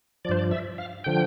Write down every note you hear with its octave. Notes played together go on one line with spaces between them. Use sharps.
G2 F3 C5 D5
D5
E5
F5
D3 F3 G5